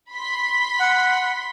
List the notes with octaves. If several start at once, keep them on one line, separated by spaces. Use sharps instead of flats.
B5 C6 B6
F#5